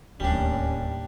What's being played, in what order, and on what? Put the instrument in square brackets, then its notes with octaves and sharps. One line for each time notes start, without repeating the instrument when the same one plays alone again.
[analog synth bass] D1 [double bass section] D#2 A2 [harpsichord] G3 D4 [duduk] C#4